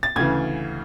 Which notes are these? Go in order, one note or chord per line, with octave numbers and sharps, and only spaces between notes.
A6
D2 C#3 E3 G#6